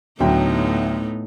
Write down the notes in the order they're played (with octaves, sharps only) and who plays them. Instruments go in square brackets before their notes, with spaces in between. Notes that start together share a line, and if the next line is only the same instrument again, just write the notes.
[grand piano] D2 F#3 G5 [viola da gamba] A2 B3 D#4